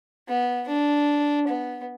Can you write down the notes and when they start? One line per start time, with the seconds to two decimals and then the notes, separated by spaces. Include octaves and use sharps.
0.29 B3
0.68 D4
1.48 B3